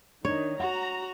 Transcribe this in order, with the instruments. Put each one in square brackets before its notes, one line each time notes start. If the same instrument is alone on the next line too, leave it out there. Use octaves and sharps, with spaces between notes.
[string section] D#3 [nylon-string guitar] D4 D#4 [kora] C#5
[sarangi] F#4 [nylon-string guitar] F#5 [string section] A#5